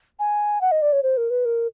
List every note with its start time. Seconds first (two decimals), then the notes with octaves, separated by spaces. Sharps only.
0.19 G#5
0.61 F#5
0.72 D#5
0.82 D5
0.92 C#5
1.03 C5
1.17 A#4
1.30 B4
1.45 A#4